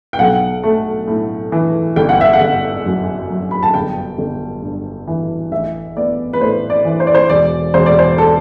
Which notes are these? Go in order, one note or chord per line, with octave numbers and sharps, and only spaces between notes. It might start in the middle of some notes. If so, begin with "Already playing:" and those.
G5
B1 F#5
A3
A2
E3
G1 G5
F#5
E5
F#5
G1
F#2
F#3
B5
A5
G1 G5
G1
G2
E3
A1 E5
B3 D5
B4
A2 C5
D5
E3
C5
D5
C5
E1 D5
E1 C5
D5
C5
A4